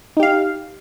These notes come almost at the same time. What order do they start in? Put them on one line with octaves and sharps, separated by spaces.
D#4 G4 F5